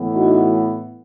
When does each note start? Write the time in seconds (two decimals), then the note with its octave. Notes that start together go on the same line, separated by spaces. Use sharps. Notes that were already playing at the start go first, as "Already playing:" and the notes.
Already playing: A2 E3 B3
0.15 D#4 F#4